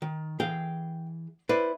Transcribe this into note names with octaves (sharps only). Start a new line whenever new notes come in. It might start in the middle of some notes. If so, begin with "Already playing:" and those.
D#3
E3 G#4 F5 G5
E4 B4 C5 D5